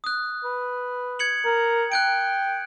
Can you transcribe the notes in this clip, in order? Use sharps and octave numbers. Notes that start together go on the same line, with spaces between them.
D#6 F#6
B4
G#6 C#7 F#7
A#4
G5 F#6 G6 D7